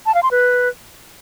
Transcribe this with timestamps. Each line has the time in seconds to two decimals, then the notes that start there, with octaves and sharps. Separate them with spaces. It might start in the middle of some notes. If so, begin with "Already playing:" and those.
0.06 A5
0.14 F5
0.23 C6
0.31 B4